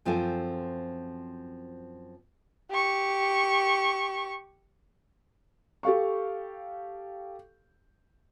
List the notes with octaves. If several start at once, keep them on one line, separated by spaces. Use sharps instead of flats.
F#2 F3 C4 A4 F5 G#5
G4 C#6
G4 A4 F5 C#6